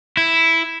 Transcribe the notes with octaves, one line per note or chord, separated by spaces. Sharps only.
E4